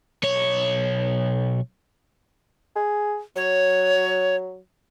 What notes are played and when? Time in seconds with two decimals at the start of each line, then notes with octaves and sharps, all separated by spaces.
0.23 B1 C#5
2.76 G#4
3.36 F#3 C#5